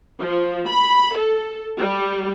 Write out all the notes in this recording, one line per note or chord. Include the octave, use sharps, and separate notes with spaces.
F3
B5
A4
G3